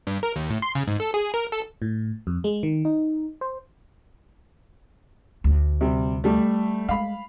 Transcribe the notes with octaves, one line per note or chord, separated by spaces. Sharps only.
G2
A#4
D#2
A2
C6
C#3
G#2
A4
G#4
A#4
A4
A2
F2
G#3
D#3
D#4
C5
D2
C3 G3
G3 A3
G#3 F5 B5